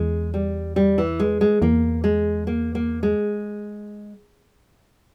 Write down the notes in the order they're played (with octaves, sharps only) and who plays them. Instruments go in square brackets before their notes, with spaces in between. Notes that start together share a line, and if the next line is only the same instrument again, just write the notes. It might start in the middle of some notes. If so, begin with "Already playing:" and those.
Already playing: [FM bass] E2 [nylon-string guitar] G#3
[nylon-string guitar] G3
G3
E3
G#3
G#3
[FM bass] E2 [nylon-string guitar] A#3
[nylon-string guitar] G#3
A#3
A#3
G#3